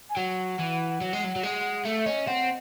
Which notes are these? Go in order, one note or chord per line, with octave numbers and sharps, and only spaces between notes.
G#5
F#3 F#5
E3
F#3
G#3
F#3
F#3
G#3
A3 E5
C#4 D#5
C4 F#5